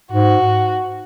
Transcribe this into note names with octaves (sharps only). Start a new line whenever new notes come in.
G#2 F#4